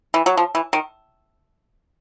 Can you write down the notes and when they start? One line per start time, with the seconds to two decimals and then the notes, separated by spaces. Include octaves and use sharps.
0.14 E3
0.26 F#3
0.37 F3
0.55 E3
0.73 D#3